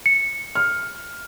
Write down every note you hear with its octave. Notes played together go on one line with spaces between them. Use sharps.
C#7
F6